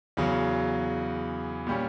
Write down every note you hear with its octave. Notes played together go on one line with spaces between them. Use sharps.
E2 C#3 F#3
A#2 G3 C#4